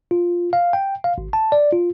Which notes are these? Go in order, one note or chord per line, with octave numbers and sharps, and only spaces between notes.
F4
F5
G5
F5
G#1
A5
D5
F4